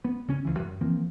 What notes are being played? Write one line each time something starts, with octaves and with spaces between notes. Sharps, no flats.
B3
C#3 C#4
C#2 E3
F#2
E3 F3 A#3 C4